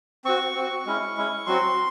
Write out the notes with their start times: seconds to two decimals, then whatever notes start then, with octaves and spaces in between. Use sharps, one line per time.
0.25 C4 F#4 C#6
0.55 C4 F#4
0.86 G#3 C#4 E4
1.17 G#3 C#4 E4
1.46 F#3 C4 F#4 C6